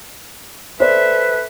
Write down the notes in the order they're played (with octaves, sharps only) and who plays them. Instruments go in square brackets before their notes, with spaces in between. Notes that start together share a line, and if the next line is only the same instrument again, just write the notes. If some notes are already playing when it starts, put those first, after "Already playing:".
[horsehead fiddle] A4 E5 [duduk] B4 [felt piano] C5 D5